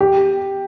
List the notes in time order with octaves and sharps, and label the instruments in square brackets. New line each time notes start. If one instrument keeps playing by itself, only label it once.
[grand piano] G4